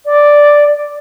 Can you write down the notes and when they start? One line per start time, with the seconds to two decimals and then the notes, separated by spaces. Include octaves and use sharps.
0.05 D5